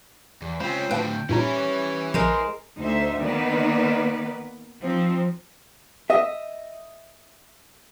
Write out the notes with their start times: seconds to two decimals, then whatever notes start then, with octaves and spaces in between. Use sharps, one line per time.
0.42 E2
0.60 G#3 C4 C#4 F4 C5 B5
0.91 A2 D3 B4 F5 G5 A5
1.29 G2 A#2 G3 C#4 D#4 E4 B4
2.14 A#1 G#3 A#4 C5
2.78 D2 D#4 C5 E5
3.23 D#3 A#3 B3 D#4 B4 D5
4.81 F3 C4 D#4
6.10 D#5 E5